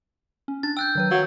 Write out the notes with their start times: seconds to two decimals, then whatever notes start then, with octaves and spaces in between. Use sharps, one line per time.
0.48 C#4
0.63 D4 A6
0.77 G5 E6 F#6 G6
0.95 D#3 F#3 B4
1.11 F#3 F5